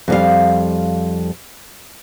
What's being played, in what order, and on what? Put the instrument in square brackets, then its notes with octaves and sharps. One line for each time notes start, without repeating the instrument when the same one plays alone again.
[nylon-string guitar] F2 G3 F5